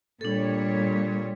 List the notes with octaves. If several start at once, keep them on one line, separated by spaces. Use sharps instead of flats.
A#2 G3 D4 A4 C#5